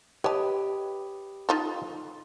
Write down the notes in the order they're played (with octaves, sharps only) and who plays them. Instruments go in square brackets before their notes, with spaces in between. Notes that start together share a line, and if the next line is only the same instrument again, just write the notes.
[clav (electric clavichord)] G4 B4 D#5 [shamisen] C#5 A5
[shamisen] D#4 F4 A4